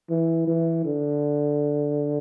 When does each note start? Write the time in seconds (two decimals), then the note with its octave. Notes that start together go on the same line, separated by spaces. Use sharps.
0.10 E3
0.47 E3
0.85 D3